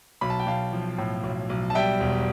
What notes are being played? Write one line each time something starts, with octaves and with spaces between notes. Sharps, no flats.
B1 B5
A5
G5
B1 F5 A5
F3
A2
B1
B1
A5
G3 E5 G5
E1